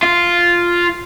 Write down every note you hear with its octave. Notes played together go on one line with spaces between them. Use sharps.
F4